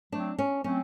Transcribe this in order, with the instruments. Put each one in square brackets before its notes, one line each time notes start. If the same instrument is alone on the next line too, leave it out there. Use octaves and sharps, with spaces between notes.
[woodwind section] F#3 A3 C4 [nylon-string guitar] D4
[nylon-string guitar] C#4
[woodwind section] F#3 A3 C4 [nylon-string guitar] C#4